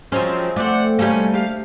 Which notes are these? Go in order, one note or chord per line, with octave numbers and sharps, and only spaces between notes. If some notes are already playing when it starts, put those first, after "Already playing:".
F3 F#3 G#3 C4 C#4 C5 G5 G#5
A3 C4 D5 F#5
D2 C3 G3 A3 A#3 C#4
G4 F5